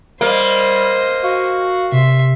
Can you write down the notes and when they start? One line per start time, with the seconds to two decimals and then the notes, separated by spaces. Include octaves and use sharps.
0.21 G3 A#3 C5 D#5
1.23 F#4 F5
1.92 C3 E5 C6